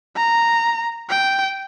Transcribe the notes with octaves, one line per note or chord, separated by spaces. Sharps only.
A#5
G5